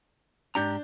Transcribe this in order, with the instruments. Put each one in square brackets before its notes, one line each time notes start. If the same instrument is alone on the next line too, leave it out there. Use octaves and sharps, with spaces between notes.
[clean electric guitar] G#2 G4 A#5 [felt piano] D4 G6